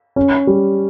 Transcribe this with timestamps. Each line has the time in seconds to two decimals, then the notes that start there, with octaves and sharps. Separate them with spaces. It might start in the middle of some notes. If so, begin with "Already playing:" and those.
0.16 C#4
0.47 G3